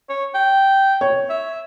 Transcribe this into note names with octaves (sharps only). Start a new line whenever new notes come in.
C#5
G5
C#5
E5